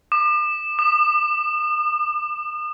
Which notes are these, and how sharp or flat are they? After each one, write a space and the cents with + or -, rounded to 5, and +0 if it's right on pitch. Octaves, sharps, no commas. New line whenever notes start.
D6 +40
D#6 -40